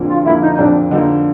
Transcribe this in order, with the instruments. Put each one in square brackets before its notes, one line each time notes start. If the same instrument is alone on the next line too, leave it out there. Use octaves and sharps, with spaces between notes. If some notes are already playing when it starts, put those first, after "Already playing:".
Already playing: [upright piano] F2 D3 F3 A#3
[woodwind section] F4
[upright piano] D3 F3 A#3 [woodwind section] E4
[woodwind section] D#4
D#4
[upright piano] F2 [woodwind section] D4
[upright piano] D3 F3 A#3 [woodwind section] D#4